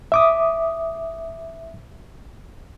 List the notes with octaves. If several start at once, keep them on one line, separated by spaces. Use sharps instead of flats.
E5 D6 D#6